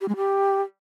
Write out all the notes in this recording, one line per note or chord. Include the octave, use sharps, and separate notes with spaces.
G4
G#3
G4